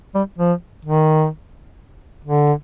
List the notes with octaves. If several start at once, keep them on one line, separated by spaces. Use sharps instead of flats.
G3
F3
D#3
D3